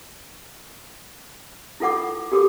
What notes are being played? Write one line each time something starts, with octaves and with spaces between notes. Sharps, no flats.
E4 F4 A4 F#5 D6
F#4 G4 A4 A#4 D6